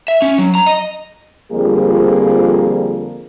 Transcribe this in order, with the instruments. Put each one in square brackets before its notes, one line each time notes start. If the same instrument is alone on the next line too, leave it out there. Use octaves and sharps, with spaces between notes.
[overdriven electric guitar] E5
C#4
F#3
A#5
D#5
[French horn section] F2 D3 F3 G3 A#3 G#4